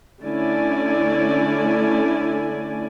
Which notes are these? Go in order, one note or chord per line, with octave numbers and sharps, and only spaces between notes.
D3 A3 C#4 E4 D5 G#5